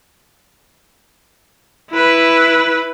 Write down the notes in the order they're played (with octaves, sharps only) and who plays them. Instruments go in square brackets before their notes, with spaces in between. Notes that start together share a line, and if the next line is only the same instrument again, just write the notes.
[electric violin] E4 B4